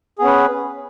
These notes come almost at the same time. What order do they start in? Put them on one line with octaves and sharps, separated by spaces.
G#4 B3 C#4 B4